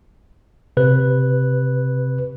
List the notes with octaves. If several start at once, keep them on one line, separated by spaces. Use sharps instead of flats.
C3 B4 F#6